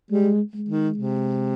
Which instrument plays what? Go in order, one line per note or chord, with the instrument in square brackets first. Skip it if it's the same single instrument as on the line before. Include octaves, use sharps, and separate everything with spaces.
[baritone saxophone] G3 [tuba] G#3
[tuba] G#3
[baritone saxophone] D#3
C3